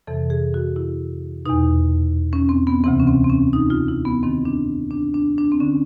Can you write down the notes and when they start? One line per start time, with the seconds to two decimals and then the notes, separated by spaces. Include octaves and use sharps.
0.07 F2 C3 E3 A4
0.30 G#4
0.54 F#4
0.76 E4
1.46 E2 B2 D#4
2.33 C#4
2.49 C4
2.67 B3
2.84 D2 C3 E3 C4
3.00 C#4
3.07 C4
3.24 C4
3.30 C#4
3.53 D#4
3.70 F4
3.88 E4
4.05 B3
4.23 F#2 D#3 C4
4.45 D4
4.91 D4
5.14 D4
5.38 D4
5.52 C4
5.60 D3 C#4